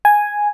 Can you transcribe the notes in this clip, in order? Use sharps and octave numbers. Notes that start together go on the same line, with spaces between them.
G#5